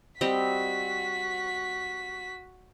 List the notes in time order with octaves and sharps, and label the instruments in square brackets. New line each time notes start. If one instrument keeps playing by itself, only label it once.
[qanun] G3 C4 D#5 [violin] F#4 B6